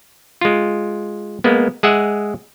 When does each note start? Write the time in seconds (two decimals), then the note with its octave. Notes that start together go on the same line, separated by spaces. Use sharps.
0.41 G#3 F4
1.44 G#3 A#3 B3
1.83 G#3 G#4 E5 F#5